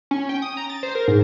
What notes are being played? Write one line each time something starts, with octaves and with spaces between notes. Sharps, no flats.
C#4
G5
D#6
A#5
A6
C5
A#4
G#2